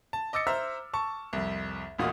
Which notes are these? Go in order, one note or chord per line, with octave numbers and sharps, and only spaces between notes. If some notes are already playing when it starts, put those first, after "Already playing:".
A5
D#5 D6 E6 A6 C#7
C5 E5 A#5 E6 F6
A5 C#6
C2 F2
E1 A1 A#2 F4 F#4 D#6